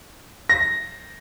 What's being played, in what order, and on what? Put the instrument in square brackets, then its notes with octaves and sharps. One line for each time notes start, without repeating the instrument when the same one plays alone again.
[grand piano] A#6